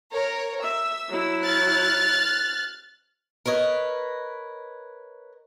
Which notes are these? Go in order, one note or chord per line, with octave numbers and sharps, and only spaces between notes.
A#4 C#5
E5 E6
F#3 E4
F6 F#6 A6
A#4 B4 C#5 D#5